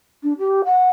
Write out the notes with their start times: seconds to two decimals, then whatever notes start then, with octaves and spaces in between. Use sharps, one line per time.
0.23 D4
0.38 G4
0.65 F#5